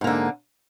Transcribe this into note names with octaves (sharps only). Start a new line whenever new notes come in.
G#2 D3 A#3